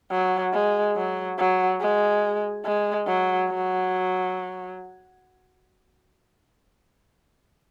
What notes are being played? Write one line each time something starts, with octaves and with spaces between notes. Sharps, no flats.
F#3
G#3
F#3
F#3
G#3
G#3
F#3
F#3